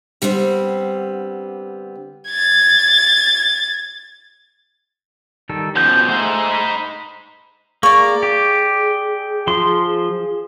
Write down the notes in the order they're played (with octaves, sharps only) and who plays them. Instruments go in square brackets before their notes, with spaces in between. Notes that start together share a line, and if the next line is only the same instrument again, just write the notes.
[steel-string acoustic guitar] D3 G3 B3 C4 C5
[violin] G#6 A6
[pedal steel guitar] D#3 G3 A4
[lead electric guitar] B2 F3 [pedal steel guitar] C#4 G6
[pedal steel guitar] A3 G#4 [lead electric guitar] D#4 C5
[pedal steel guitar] B5
[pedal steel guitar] A#3 [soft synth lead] G#4 [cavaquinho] D5 C#6
[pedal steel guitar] G4
F3 C6